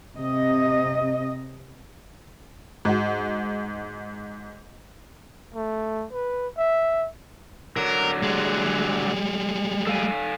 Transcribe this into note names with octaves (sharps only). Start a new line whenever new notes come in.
C3 D#5
G#2 F#4
A3
B4
E5
D3 F#3 A#4
G3 G#3
A4 F5 G#5